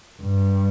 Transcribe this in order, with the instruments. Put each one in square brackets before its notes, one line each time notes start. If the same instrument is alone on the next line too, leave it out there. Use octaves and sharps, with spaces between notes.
[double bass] G2